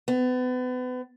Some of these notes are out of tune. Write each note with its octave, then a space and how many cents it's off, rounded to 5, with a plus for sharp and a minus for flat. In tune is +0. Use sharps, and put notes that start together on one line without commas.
B3 +35